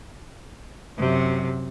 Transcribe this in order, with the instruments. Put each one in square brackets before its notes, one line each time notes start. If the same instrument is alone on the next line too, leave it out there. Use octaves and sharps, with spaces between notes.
[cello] F#2 C3